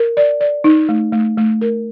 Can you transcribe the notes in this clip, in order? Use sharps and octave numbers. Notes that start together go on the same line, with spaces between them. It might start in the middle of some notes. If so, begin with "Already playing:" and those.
Already playing: A#4
D5
D5
D#4
A3
A3
A3
A#4